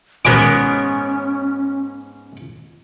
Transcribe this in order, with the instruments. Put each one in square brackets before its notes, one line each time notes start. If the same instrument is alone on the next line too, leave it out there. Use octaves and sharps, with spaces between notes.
[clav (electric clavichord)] G#2 G#3 B3 [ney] C#4 [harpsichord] A#4 D6